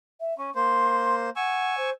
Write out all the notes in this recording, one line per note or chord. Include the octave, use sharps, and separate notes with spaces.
E5
C#4 C#6
A#3 C5 C6
F#5 G#5 C#6 E6
C5